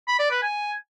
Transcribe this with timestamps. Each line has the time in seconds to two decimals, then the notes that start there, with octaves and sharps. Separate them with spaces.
0.08 B5
0.19 D5
0.31 B4
0.42 G#5